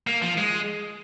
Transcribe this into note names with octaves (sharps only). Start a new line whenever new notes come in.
A#3
F3
G#3